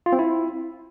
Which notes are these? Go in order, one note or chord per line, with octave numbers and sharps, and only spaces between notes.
F4
C4
E4